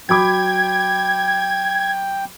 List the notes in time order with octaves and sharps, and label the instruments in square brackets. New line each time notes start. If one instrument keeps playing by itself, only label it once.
[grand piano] F#3 B5 D6 [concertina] G5 [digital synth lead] G#6